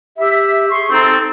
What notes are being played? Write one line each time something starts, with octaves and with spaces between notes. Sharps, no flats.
G4 E5
G#4 C6 C#6
C4 D#4 A4